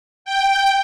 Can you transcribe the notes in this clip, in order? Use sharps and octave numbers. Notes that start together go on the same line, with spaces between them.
G5